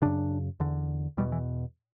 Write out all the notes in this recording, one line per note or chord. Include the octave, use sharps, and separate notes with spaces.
F#2 C#3 D4
E2 D3
E2 B2 G3
E3